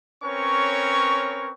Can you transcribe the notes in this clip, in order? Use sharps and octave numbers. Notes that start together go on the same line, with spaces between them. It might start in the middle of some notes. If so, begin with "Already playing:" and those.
C4 C#4 A#4 B4 C#5 C#6